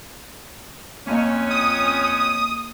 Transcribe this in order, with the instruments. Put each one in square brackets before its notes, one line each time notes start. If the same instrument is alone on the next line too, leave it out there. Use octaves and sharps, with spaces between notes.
[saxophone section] F2 C#4 [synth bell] A3 A#3 D#5
[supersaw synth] D#6